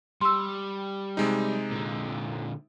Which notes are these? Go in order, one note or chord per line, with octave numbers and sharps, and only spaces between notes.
G3 C6 E6
C3 G#3 D#4
A#2 D3